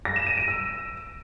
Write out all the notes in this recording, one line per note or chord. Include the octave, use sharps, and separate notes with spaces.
A#6
E7
D#7
D7
E6